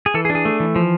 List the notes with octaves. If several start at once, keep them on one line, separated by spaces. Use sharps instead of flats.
G#4
E3 A4
G#4
D4
G#4
A3
E3
F3